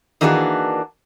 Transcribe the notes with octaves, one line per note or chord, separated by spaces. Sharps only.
D#3 E3 A#3 D4 F#4 G#4